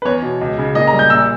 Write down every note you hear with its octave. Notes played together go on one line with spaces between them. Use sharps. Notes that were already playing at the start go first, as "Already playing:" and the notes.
B4
E2 C#5
B2
C#2
C#3
A#2 D#5
A#5
G3
G6
A#1 E6